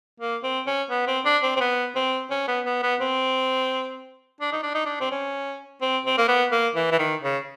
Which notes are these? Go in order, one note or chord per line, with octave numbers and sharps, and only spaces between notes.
A#3
C4
C#4
B3
C4
D4
C4
C4
B3
C4
C#4
B3
B3
B3
C4
D4
D#4
D4
D#4
D4
C4
C#4
C4
C4
A#3
B3
A#3
E3
E3
D#3
C#3